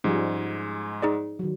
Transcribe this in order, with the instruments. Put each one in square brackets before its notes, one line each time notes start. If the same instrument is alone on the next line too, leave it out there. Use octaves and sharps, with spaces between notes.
[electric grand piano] G#2 G#3 [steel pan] F3 G3 C#4
[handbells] D#4 G#4 D5
[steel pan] D#3 F#3